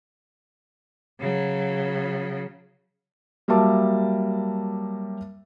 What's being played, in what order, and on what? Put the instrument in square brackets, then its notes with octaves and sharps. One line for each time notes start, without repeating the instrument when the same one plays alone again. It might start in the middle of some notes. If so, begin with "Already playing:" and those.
[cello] C#3 F#3
[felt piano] F#3 G3 A#3 E5 A5 D6